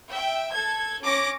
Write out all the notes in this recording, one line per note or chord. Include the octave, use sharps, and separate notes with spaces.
E5 G5
A4 G#6
C#4 D6 A#6